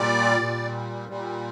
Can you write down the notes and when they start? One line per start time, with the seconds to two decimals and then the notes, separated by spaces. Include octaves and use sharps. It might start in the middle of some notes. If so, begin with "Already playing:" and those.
Already playing: A#2 G3 D5
0.40 A#2 G3
1.09 A#2 G3